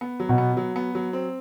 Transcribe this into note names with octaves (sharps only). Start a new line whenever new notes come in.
B3
F#3
B2
B3
F#3
B3
F#3
C4